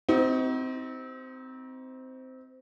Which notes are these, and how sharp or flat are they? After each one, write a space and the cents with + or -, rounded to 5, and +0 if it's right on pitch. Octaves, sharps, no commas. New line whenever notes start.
C4 -15 D#4 +30 F#4 +40